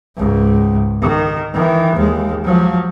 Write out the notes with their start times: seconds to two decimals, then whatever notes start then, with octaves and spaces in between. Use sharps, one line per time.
0.16 C#2 G#2
1.02 D#3
1.54 D#3 E3
1.96 D#2 G#3
2.44 F3 F#3